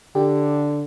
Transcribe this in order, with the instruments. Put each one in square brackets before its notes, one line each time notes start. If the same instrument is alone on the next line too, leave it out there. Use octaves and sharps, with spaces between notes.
[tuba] D3 [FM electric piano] G4